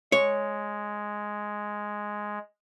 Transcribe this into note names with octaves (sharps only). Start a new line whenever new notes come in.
G#3 C#5